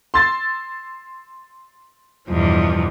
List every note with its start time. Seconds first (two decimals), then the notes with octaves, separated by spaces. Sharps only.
0.14 C6 E6 A6
2.29 E2 G2 B2 F3